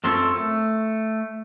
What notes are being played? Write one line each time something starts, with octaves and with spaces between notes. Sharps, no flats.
F#2 C4 F4 A4 C#5
A3